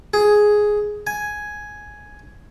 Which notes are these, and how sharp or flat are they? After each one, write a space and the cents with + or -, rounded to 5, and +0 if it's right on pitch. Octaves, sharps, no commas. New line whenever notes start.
G#4 +5
G#5 +5